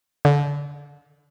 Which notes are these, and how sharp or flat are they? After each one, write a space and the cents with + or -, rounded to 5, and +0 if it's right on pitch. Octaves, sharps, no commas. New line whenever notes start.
D3 -30